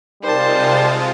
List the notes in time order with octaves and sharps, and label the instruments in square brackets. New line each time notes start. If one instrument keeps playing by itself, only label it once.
[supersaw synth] C3 G#3 F4 [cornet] G3 [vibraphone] D#4 A#4 [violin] C5 A5